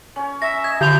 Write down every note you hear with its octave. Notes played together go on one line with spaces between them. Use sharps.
C#4 C#5
E5 A#5 C#6 A#6
D#5 G#6
D3 F3 E4 C6 G6 F7